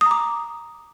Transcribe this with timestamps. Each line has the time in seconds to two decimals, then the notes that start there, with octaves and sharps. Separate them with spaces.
0.01 D#6
0.06 A#5
0.11 D6